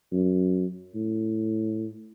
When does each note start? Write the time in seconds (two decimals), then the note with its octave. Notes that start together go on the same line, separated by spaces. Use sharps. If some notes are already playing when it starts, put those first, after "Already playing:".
0.12 F#2
0.95 A2